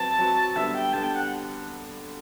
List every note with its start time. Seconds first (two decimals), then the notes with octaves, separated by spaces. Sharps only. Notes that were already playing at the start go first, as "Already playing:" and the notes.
Already playing: F#3 C4 F#4 B4 A5
0.19 F#3 C4 F#4 B4
0.56 D3 G3 B3 E5
0.74 G5
0.93 D3 G3 B3 A5
1.04 G5
1.15 F#5